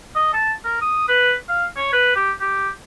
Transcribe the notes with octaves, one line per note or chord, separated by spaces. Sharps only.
D#5
A5
A#4
D#6
B4
F5
C#5
B4
G4
G4